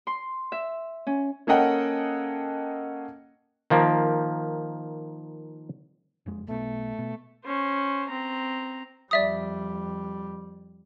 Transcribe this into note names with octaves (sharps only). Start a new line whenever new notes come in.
C6
E5
C#4
A#3 C#4 A4 D#5 F#5 G5
D#3 F3 A#3
F#1 F2 G#3
B1 B2 A3
B2
C#4 C5
C4 A#5
F2 G3 D5 E5 D#6